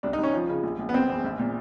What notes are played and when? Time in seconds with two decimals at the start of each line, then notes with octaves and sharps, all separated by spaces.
0.03 C2 D4
0.13 D#4
0.18 C2
0.23 C#4
0.33 F3
0.49 C#3
0.63 A#1
0.78 A#1
0.89 B3
0.94 F#1 C4
1.09 E2
1.24 A#1
1.39 A#2